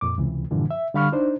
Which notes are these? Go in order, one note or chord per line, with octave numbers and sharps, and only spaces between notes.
F2 A#2 D6
C#2 C3 E3
G2 A#2 D3 E3 F3
E5
D3 G3 F5 B5 C#6 F6
D4 D#4 C5